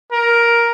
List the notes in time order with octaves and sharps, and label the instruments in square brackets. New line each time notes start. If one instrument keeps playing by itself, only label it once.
[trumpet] A#4